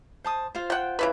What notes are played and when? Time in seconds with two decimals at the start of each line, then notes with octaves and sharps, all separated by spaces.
0.24 C5 A5 D#6
0.55 F4 C5
0.70 F#5 G5
0.99 C#3 E3 B4